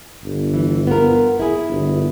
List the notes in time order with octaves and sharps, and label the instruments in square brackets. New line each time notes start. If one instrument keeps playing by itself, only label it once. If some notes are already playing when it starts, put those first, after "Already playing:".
[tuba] G1
[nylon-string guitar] E3
B3 F4 A#4
E4 G#4
[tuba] G1